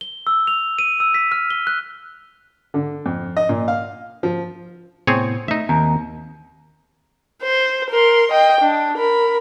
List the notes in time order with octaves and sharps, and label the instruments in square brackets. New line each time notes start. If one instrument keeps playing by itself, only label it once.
[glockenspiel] G7
E6
F7
D#7
E6
B6
F6
G7
F#6
[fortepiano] D3
F2
D#5
A#2
F5
F3
[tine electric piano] A2 C3 B3 [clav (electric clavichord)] C4 G#4 C#5
[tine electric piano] A3 [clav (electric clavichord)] D#4 E5
[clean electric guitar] D#2 [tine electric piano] C4 [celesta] A#5
[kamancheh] C5
A#4 C6
D#5 G5
D4
A#4 B5